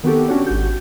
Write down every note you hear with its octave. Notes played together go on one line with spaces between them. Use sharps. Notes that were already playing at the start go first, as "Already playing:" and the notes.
D#3 B3 C4 F#4 G4 A4
C#4 D4 F#4 G4 C#5
G#1 F#4 G6